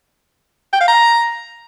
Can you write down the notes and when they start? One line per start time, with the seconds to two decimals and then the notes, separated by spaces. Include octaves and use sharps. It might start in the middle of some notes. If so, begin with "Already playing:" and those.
0.73 G5
0.81 F5
0.88 A#5